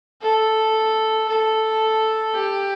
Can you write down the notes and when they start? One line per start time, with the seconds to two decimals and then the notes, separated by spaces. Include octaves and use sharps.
0.22 A4
1.28 A4
2.34 G4